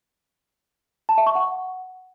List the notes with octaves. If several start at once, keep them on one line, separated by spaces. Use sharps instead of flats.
A5
E5
C#6
F#5